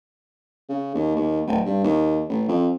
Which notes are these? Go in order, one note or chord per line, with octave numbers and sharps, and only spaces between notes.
C#3
D#2
D#2
D1
G2
D#2
A1
F2